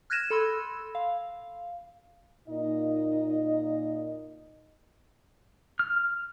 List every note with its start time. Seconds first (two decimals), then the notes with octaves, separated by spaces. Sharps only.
0.10 F6 F#6 G#6 A#6 D#7 E7
0.30 A4 B5 C6 E6
0.95 F5
2.48 A#2 D#4 D#5
5.79 F6